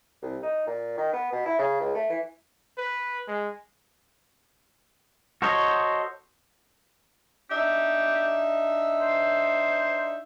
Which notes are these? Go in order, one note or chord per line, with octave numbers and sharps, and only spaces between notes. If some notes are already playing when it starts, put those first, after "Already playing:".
C2
D#4
A#2
D#3
B3
B2
E4
C#3
C#2
A3
E3
B4
G#3
F#4 A4 C5 C#5 D#5
D4 D#4 G4 E5
C5